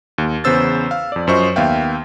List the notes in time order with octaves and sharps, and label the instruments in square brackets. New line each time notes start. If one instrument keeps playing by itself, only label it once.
[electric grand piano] D#2
E2 C#3 B3 C5 E6 A6
F5
F2 D5
F#2 F4 C5 D#5 C#6
D#2 B3 E5 F5 G5